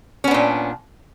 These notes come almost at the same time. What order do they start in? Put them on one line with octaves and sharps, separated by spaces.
C#4 B3 D4 A#2